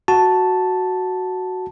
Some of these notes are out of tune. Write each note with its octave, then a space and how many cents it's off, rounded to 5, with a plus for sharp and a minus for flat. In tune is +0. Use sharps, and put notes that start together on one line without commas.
F#4 +0 A5 +0